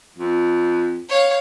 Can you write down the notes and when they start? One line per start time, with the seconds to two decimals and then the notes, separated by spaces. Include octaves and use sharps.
0.18 F2
1.09 C#5 F5